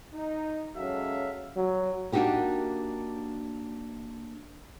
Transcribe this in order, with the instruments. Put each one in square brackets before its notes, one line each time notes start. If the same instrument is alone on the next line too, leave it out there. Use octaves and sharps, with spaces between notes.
[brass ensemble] D#4
F#3 G#3 C#4 A4 E5 F5
[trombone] F#3
[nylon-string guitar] A#3 D4 D#4 F#4 G4 A#4